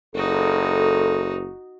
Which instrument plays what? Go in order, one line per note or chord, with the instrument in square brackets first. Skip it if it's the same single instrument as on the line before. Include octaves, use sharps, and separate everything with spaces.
[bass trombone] F#1 [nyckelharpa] D#4 F#4 [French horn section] A4